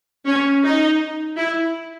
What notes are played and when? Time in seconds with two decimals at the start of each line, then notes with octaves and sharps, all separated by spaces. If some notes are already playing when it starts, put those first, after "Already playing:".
0.27 C#4
0.64 D#4
1.38 E4